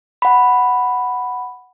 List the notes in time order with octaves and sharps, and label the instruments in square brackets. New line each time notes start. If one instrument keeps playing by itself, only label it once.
[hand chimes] F#5 B5